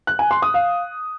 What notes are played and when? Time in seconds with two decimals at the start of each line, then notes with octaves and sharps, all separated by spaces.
0.07 F#6
0.19 G#5
0.31 C6
0.42 D#6
0.54 F5